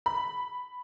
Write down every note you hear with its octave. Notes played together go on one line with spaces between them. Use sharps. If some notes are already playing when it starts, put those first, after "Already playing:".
B5